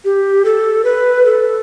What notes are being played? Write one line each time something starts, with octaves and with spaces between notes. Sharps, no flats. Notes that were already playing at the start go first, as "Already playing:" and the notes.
G4
A4
B4
A4